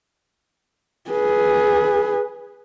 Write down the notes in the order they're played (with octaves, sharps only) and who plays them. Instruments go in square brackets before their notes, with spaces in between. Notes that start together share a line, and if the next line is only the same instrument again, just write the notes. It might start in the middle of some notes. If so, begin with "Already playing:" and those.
[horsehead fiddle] G#4 B4